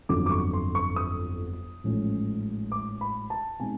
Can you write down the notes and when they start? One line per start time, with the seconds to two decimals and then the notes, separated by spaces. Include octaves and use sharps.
0.09 G1 F2 D3 F#3 D6
0.26 D6
0.31 C#6
0.53 C6
0.75 C#6
0.96 D#6
1.84 A1 G#2 F3 A3 C#4
2.72 D6
3.01 B5
3.30 A5
3.60 B2 G#3 C4 D#4 G#5